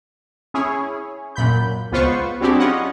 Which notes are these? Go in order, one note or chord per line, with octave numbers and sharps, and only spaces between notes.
C#4 E4 G#4 C#5
F#2 A#2 B5 G6
C#2 B3 F4 B4 C5 C#6
F#3 C4 D4 E4 G4 G#4
C#4 F4 C#5 D#5 F#5